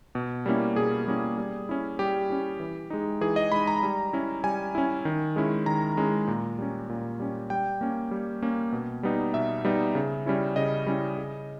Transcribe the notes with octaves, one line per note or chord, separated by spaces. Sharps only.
B2
G3 A#3 C#4 E4
B2 G#4
G3 A#3 C#4 E4
G3
C#4 E4
G3 G4
C#4 E4
E3
G#3 D#4
E3 G#4
D#5
G#3 D#4 B5
A#5
G3
C#4 E4
G3 G#5
C#4 E4
D#3
G#3 C#4 E4
D#3 A#5
G#3 C#4 E4
A#2
G3 C#4
A#2
G3 C#4
G3 G5
A#3 C#4
G3
A#3 C#4
B2
G3 B3 D#4
B2 E5
G3 B3 D#4
C#3
G3 C#4 E4
C#3 D#5
G3 C#4 E4
C#3